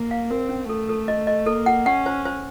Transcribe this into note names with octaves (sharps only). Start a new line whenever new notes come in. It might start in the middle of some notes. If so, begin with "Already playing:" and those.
Already playing: A#3
F5
C4 A#4
C#4
A3 A4
A4
D#5
D#5
A#3 A4
F#5
C#4 F#5
C5
C5